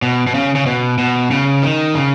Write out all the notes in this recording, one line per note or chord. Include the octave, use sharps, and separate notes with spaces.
B2
B2
C#3
C#3
B2
B2
C#3
D#3
C#3